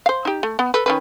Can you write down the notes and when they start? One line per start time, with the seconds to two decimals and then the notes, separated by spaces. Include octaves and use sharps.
0.06 C5 F5
0.25 D#4 G4
0.43 A3
0.59 B3
0.74 A4 B4
0.86 D#3 C#4 B4